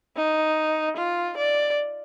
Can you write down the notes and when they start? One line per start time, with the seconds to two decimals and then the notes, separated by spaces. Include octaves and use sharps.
0.17 D#4
0.97 F4
1.37 D5